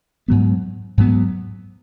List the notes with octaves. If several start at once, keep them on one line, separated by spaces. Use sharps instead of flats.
G#2 F#3 B3
G#2 F#3 B3